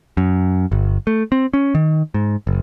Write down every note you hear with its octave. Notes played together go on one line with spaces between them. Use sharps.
F#2
G1
A3
C4
C#4
D#3
G#2
F#1